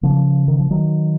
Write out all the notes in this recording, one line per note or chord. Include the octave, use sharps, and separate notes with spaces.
C#3 F3
D#3
F3
D#3 F#3